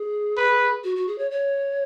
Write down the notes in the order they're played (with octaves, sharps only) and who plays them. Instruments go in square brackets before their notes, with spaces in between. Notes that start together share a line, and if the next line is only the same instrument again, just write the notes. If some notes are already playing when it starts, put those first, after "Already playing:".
Already playing: [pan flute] G#4
[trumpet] B4
[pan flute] F#4
F#4
G#4
C#5
C#5